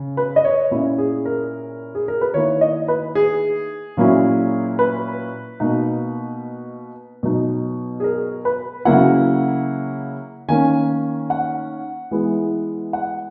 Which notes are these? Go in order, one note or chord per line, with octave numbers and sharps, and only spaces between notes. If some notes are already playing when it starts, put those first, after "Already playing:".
Already playing: C#3
B4
D#5
C#5
A#2 A#3 C#4 E4
G#4
A#4
G#4
A#4
B4
D#3 A#3 E4 C#5
D#5
B4
G#4
A#2 F#3 A#3 C#4 E4
B4
B2 A#3 D#4
B2 F#3 B3 D#4
G#4
A#4
B4
C#3 F#3 A#3 E4 F#5
D#3 A#3 C#4 G#5
F#5
E3 G#3 B3 E4
F#5